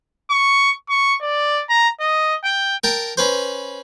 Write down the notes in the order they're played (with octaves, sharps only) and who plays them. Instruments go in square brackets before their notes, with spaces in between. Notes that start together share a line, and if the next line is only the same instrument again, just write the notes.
[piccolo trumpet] C#6
C#6
D5
A#5
D#5
G5
[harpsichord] A#4 G5 A5
C#4 B4 C5